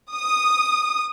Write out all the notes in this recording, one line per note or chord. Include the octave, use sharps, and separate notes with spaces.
D#6